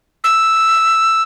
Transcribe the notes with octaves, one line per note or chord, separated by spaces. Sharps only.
E6